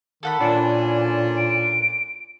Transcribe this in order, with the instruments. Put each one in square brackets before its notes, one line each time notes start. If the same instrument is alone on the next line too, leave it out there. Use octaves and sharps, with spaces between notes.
[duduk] D#3 [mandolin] A4 F#5 B5
[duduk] A#2 [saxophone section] E3 C#4 D4 [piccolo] G#5
[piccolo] D7